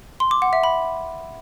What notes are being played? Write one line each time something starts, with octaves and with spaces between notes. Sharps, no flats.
C6
D6
F#5
E5
B5